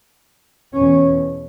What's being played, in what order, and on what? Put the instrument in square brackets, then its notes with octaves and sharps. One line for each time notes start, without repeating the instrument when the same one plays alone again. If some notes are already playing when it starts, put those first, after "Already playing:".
[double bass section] E2 B2 C#4